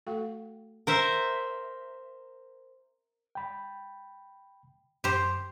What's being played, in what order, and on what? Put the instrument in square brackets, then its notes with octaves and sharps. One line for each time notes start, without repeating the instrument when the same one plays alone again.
[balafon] A3 F#4 A4 F5 G5 C#6
[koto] A#4 C5 E5
[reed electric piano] G5 B5
[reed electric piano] F#2 C6 [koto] G4 C5